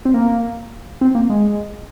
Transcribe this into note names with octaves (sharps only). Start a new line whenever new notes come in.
C4
A#3
C4
A#3
G#3